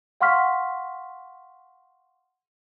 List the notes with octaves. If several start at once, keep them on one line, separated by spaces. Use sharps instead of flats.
F5 F#5 C6 C#6 F6 B6